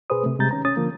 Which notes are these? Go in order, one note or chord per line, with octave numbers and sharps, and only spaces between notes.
B2 G#4 B4 C5 D#6
C3 A3
C3 G3 G#3 A#5 G6 A6
D#3 C#4 A#5
C#4 D#6 A6
D3 F3 A#3